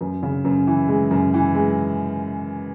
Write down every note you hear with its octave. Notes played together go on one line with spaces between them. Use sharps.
F#2
C#3
F#2
E3
G#3
F#2
E3
G#3